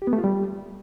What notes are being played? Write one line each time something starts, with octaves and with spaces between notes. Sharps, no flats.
G4
B3
A3
F4
G3